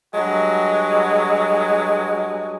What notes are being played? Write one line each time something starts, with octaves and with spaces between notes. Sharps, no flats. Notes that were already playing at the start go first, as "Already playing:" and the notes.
G2 F#3 G#3 F#4